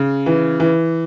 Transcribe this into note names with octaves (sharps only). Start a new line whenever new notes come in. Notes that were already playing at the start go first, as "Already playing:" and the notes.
Already playing: C#3
E3
E3